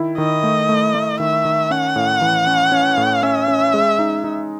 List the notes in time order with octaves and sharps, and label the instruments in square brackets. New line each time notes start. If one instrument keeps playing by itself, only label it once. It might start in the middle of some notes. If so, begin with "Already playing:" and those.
Already playing: [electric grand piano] D#3 E4
[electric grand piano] D#3 [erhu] D#5
[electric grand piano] A3
A3
A3
[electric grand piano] D#3 [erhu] E5
[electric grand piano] D#3
[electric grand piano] C#4 [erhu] F#5
[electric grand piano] A2
E3
C#4
C#4
A2
[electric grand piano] C#4 [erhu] E5
[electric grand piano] C#4
G#3
D#4
D#4